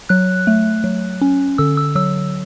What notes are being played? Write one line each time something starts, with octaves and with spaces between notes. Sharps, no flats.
F#3 F#6
A3
F#3
C#4
D3 E6
E6
F#3 E6